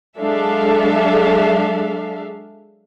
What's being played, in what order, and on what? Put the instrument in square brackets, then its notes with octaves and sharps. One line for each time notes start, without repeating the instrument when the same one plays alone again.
[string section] F#3 G#3 D4 A4 E5 F5